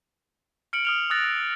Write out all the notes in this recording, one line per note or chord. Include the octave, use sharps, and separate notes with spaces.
F6 C#7 D7 F#7
D#6 F6 F7
D#6 E6 F#6 A6 A#6